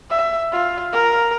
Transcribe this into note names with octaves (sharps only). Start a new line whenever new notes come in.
E5
F4
A#4